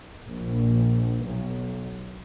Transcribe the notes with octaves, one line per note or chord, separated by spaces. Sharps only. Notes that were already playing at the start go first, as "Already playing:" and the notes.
A#1
B1